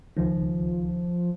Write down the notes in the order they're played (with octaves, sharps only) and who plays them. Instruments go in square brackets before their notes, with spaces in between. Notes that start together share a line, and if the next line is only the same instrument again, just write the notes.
[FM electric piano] C#2 D#3 [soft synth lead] F3